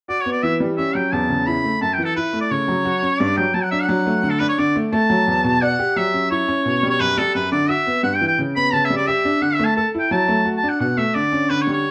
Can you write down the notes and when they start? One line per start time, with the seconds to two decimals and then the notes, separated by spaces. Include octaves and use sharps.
0.08 F#4 D5
0.20 C#5
0.26 B3
0.32 D5
0.43 E3 E5
0.60 G3
0.78 C#4 E5
0.95 F#3 G5
1.13 E2 A5
1.29 C#3
1.46 E4 B5
1.64 A3
1.81 F#2 A5
1.93 E3 G5
2.05 A4
2.16 E4 B4
2.33 A3
2.41 D5
2.51 C#3 C#5
2.68 F#3
2.85 F#4
3.03 C#4
3.20 G2 D5
3.37 F#3 G5
3.54 F#3 A5
3.63 F#5
3.71 D4 E5
3.80 F#5
3.89 F#3
4.06 A3
4.23 D3
4.30 A4
4.40 D4 B4
4.49 C#5
4.58 D3 D5
4.76 A3
4.93 A3 A5
5.10 F#3
5.27 E2
5.44 B2
5.62 D5 F#5
5.79 G4
5.96 F#3 E5
6.14 C#4
6.31 E4 C#5
6.48 C#4
6.65 B2
6.83 G3
6.90 C#5
7.00 F#2 B4
7.18 G3 A4
7.35 F#2 B4
7.52 D3 D5
7.69 F#4 E5
7.87 B3
8.03 G2 F#5
8.15 G5
8.21 E3
8.27 G5
8.39 C#3
8.56 B3 B5
8.73 C#3 A5
8.85 E5
8.90 G3
8.96 D5
9.07 G4 E5
9.25 D4
9.42 D3 F#5
9.54 E5
9.59 A3
9.65 A5
9.76 A4 A5
9.95 E4 G5
10.11 F#3 A5
10.28 A3
10.45 F#4
10.57 A5
10.63 D4
10.69 F#5
10.80 B2 F#5
10.97 A3 E5
11.14 D3 D5
11.32 C#4
11.50 D3 B4
11.61 C#5
11.67 G3
11.73 C#5